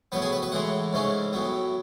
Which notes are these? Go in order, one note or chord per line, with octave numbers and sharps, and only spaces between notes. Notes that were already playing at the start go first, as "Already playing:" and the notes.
A2 F#3 B3 B4
G#4
B4
B4
A2 E3 G#3 F#5
G#2 E3 A3 C#4
A2 F#3 B3